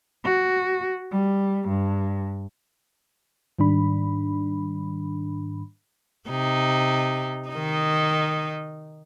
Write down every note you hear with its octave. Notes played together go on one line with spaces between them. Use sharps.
F#4
G3
G2
G#2 D#3 G3 D4 B5
C3 D#4
D#3 D#4